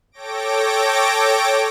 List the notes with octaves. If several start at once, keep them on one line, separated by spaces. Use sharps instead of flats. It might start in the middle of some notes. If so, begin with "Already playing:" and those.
A4 C#5 G5 D6 A#6 D7